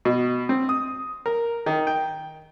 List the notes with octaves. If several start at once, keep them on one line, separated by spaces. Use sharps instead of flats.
B2
C4
D#6
A#4
D#3
G5